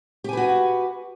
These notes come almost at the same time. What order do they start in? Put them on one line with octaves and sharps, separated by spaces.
G4 G#5 B4 F#4